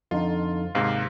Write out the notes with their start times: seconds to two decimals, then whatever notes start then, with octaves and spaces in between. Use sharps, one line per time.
0.11 F2 D3 D#4 F4
0.75 D#2 G#2 C3 F5